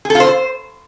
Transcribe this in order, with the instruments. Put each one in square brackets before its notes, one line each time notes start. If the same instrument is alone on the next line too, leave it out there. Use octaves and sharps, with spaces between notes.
[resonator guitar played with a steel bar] G#4
A4
F4
C5